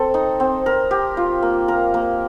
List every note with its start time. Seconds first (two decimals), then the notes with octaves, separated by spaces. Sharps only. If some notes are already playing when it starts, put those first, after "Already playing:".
Already playing: C4 A4
0.14 D#4
0.40 C4
0.66 A#4
0.91 G4
1.17 F4
1.42 A#3
1.68 A#4
1.94 A#3